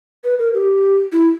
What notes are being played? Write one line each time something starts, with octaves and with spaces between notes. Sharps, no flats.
B4
A#4
G4
E4